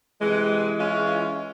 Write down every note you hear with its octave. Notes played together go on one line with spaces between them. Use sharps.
C3 E3 G#3
E3 G#3 C#4 F4